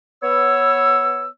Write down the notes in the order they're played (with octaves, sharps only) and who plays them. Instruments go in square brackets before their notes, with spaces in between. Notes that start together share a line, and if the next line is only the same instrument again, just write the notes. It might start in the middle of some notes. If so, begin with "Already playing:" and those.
[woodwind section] B3 C#5 E6